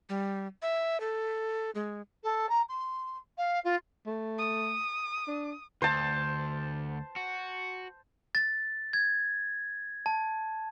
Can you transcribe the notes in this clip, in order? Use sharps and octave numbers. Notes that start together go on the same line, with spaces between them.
G3
E5
A4
G#3
A4
A#5
C6
F5
F4
A3
D#6
D4
D2 C5 A5
F#4
A6
G#6
A5